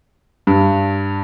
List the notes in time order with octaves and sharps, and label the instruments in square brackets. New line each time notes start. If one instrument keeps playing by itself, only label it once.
[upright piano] G2